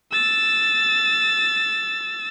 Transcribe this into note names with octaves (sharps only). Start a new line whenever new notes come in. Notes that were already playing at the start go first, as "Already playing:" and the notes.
E6 A6